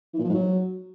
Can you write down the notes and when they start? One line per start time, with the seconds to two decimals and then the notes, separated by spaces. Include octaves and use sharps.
0.14 E3
0.19 A#2
0.24 F3
0.29 G#2
0.34 F#3